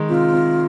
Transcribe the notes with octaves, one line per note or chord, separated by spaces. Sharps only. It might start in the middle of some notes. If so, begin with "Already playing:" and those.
Already playing: D#3 G#3
C3 F4
C3